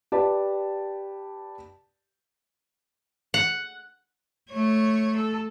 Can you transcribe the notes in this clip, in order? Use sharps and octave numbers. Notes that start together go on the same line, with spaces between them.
G4 B4 D5 A5
F#5
A3 C#5
A4